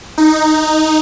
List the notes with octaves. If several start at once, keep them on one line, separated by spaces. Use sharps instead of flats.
D#4